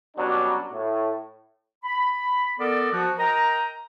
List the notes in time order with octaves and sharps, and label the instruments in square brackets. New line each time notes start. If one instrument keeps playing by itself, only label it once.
[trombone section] B2 F#3 G3 C#4 D4
A2
[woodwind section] B5
B3 A4 A#4 D5
F3 F#4
A#4 D#5 G5 A#5